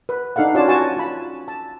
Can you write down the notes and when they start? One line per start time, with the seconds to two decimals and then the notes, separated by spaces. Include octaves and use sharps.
0.09 B4
0.36 D4 D#4 A4 F5 F#5
0.55 C#4 F4 F#4 C#5 D5 A5
0.68 F#4 G#5 A5 C#6
0.96 F4 B5
1.48 A5